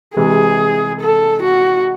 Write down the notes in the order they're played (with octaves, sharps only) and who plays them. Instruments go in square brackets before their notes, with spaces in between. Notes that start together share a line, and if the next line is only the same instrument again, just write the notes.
[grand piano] C3 E3 G#3 [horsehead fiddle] G#4
[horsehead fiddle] A4
F#4